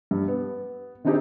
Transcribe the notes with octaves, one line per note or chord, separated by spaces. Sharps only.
G2
B3
D#3 C4 D4 D#4 G4 G#4